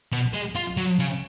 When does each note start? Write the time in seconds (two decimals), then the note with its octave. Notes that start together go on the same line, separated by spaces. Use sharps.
0.12 B2
0.33 G#3
0.55 F4
0.77 F#3
0.99 C#3